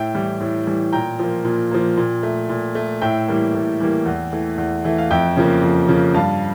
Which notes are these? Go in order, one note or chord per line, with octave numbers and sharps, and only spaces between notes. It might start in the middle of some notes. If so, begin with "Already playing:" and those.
Already playing: A2 E5 G5
E3 G3
A2
E3 G3
A#2 G5 A#5
F3 A#3
A#2
F3 A#3
A#2
A3
A#2
A3
A2 E5 G5
E3 G3 A#3
A2
E3 G3 A#3
E2
E3 A3
E2
E3 A3
F5
F2 E5 G5
C#3 F3 A#3
F2
C#3 F3 A#3
G2 F5 A5